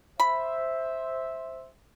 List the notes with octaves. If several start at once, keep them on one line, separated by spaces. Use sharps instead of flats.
C5 E5 B5